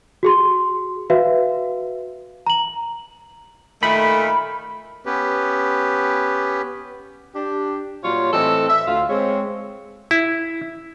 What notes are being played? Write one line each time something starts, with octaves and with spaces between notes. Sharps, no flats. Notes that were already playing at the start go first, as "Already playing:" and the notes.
F#4 G#4 C6
F#4 B4 E5 F5
A#5 F#7
A#2 D#3 A3 B5
B3 C#4 G4 B4
D4 G4
A#2 F#3 G3 F4 C#5
A2 E3 C4 A4 D5 D#5
E5
D2 F4 F5
G#3 C4 C#5
E4